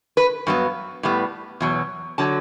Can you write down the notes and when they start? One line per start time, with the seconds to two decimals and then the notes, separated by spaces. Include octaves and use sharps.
0.17 B4
0.47 G2 F#3 B3
1.03 A2 G3 B3
1.61 E2 B2 F#3
2.18 D3 F#3 A5